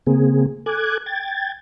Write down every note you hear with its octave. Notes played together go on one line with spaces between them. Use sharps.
C#3 A#3 C4 G#4
A4 G#5 D6 F#6 G#6
G5 G#6 A6